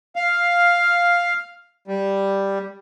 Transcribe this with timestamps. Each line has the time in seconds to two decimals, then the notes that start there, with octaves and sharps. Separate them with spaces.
0.16 F5
1.87 G3